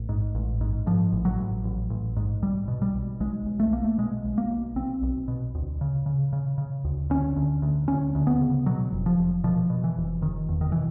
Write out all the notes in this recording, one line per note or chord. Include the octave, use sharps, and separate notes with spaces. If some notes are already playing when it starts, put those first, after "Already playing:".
Already playing: A1
G#2
A1
G#2
G#2 F3
A1
F#3
A1
A1
A1
G#2
B1 G3
B2
G3
B1
B1 G#3
B1
A3
B1 A#3
A3
B2 G#3
B1
A#3
B1
B1 C4
B1
B2
D2
C#3
C#3
C#3
C#3
D2
D2 C#4
D2
D2
D2 C#4
D2
B3
C#3
B2 F#3
F1
F3
F1
B2 F3
B2
E3
F1
F1 D#3
E2
D#3
B2 E3